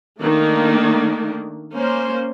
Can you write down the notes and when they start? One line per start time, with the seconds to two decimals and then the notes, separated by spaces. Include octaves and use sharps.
0.22 D#3 A3 A#3 D4
1.74 A#3 C#4 C5